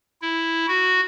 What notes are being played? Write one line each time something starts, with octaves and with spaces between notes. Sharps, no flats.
E4
F#4